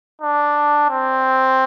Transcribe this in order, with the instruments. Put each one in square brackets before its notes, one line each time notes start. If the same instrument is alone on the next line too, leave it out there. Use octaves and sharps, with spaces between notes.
[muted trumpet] D4
C4